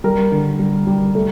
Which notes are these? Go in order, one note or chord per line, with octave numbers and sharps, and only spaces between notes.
G3 A#4
D3
G3
G3
A3